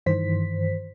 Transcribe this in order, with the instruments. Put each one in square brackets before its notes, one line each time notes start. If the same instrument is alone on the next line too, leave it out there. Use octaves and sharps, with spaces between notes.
[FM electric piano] G2 D#3 E3 C5 B6